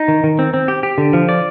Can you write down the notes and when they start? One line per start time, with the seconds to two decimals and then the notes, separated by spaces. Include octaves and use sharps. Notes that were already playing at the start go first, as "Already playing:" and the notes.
Already playing: D#4
0.08 D#3
0.24 D#3
0.39 C4
0.54 C4
0.68 G4
0.83 G4
0.98 D3
1.13 F3
1.29 D5